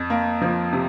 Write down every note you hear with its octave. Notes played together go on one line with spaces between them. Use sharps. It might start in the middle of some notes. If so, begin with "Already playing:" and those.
Already playing: F2
A#3
F3
C3